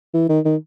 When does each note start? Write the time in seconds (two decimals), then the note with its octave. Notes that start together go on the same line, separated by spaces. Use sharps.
0.14 E3
0.29 D#3
0.45 D#3